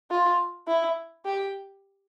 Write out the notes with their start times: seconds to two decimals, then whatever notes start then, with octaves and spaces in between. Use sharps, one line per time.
0.11 F4
0.67 E4
1.25 G4